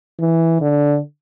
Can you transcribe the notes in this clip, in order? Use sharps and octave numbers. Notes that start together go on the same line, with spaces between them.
E3
D3